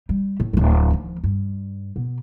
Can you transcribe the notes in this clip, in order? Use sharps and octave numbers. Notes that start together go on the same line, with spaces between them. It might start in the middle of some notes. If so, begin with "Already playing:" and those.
G3
A2
D1 C#2
D#3 F3
G2
B2